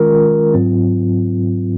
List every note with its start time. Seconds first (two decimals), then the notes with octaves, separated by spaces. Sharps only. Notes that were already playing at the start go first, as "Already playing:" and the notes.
Already playing: D#3 G#3 C#4 F4 A#4
0.54 G#2 F#3 C4 F4